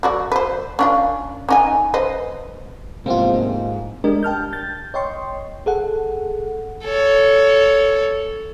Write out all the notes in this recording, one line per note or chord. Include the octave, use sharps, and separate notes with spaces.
F#3 F#4 D5
B4 C5
C#4 D4 F4
C#4 D#4 G#5
B4 C5 D#5
E2 G#2 C3 D#3 F3 A#3 C4 F4
G#3 D4 G4 A#4 D#5
G5 A5 F6 G6
G6 A6
C#5 D#5 G5 C6 C#6
G#4 A4 F#5
A4 C#5